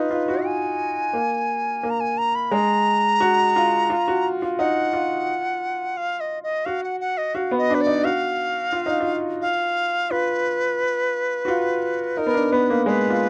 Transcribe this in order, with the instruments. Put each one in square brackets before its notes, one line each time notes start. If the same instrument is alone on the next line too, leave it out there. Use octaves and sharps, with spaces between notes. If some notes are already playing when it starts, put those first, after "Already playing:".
Already playing: [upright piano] D#4 F4 [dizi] B4
[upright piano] F4
F#4
[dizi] G#5
[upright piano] A#3
A#3
[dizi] A#5
G#5
A#5
B5
[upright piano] G#3 [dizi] A#5
[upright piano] F#4
F4
F4
F#4
F4
[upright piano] D#4 [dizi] F#5
[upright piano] F4
[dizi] F5
D#5
D#5
[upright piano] F#4 [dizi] F5
[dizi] F#5
F#5
D#5
[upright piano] F#4 [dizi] F5
[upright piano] B3
[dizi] D#5
[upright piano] D4 [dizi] B4
[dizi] D5
[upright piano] D#4
[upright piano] F#4 [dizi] F5
[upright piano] F4
D#4
F4
[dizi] F5
[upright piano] F4 [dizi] B4
[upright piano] F#4
F4
[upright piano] D#4 [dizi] A#4
[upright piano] B3
D4
[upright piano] B3 [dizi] B4
[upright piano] A#3
[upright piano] G#3 [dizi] B4
[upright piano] F4